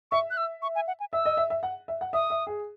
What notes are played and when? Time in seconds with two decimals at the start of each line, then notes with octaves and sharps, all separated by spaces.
0.11 E5 C#6
0.31 F#6
0.37 E6
0.62 C#6
0.75 G#5
0.87 F#5
1.00 G#5
1.13 E5 E6
1.25 D#5
1.37 E5
1.50 E5
1.63 F#5
1.88 E5
2.01 F#5
2.13 E5 D#6
2.30 E5
2.47 G#4